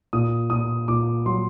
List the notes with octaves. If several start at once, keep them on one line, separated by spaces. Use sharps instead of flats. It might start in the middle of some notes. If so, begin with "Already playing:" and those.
A#2 D#6
A#2 D#6
A#2 D6
F#3 C6